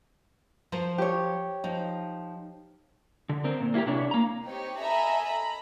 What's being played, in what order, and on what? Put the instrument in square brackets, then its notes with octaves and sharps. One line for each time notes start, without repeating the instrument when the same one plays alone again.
[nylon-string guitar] F3 A#4 C5
[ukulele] G4 C#5
[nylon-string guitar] F3 D#4
[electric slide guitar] D3
C4 A#4
A#2
A#3 E4 F4 G4 A#4
C3 D4 E4 C#5
A#3 A#5
[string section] C4 D#4 G4 C#5
A4 D#5 E5 G#5 A#5 B5
A#5 B5